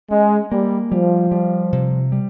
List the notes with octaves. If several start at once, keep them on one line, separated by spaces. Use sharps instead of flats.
G#3 C#4
G3 A#3
F3 G3
G3
C3
G3